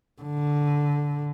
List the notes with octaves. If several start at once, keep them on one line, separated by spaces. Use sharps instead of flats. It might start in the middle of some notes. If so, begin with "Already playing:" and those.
D3